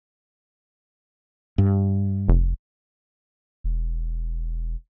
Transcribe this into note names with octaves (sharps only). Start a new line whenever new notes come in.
G2
F1
E1